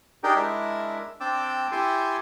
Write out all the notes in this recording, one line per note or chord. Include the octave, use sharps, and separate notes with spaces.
D4 D#4 G4 G#4 A#4 G5
G#3 D4 E4 A#4 E5
C4 D4 D5 G5 D6 E6
E4 G4 A4 G5 G#5 C6